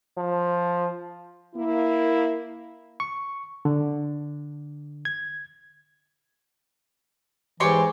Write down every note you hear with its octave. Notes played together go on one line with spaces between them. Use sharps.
F3
A#3 E4
C#6
D3
G#6
G#2 E3 G4 C#5 A#5 C6